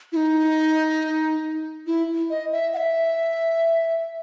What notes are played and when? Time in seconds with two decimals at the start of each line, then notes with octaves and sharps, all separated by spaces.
0.12 E4
0.16 D#4
1.87 E4
2.30 D#5
2.52 E5
2.74 F#5
2.77 E5